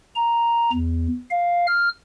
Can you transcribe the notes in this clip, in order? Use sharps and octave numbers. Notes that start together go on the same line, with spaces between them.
A#5
E2
F5
F6